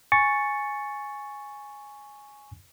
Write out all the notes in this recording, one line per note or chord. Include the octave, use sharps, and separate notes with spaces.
G#5 C#6 A6 C#7